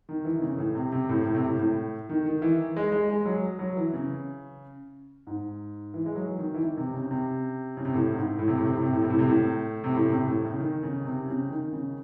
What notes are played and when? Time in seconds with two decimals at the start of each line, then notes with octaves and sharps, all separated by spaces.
0.09 D#3
0.25 E3
0.36 D#3
0.42 C#3
0.58 A2
0.75 C3
0.92 C3
1.09 A2
1.26 A2
1.35 C3
1.45 A2
1.59 A2
2.09 D#3
2.26 D#3
2.42 E3
2.76 G#3
2.92 G#3
3.10 G#3
3.26 F#3
3.59 F#3
3.77 E3
3.93 C#3
5.27 G#2
5.94 E3
6.06 G#3
6.15 F#3
6.38 D#3
6.54 E3
6.61 D#3
6.77 C3
6.94 C#3
7.11 C3
7.77 C#3
7.85 C3
7.94 A2
8.15 G#2
8.39 A2
8.48 C3
8.56 A2
8.65 C3
8.75 A2
8.83 C3
8.93 A2
9.02 C3
9.10 A2
9.19 C3
9.28 A2
9.84 C3
9.95 A2
10.06 C#3
10.10 C3
10.27 A2
10.44 C#3
10.60 D#3
10.83 C#3
11.05 C3
11.28 C#3
11.50 D#3
11.73 C#3